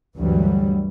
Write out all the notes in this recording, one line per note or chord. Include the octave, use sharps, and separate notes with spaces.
D2 G2 E3 F#3 G3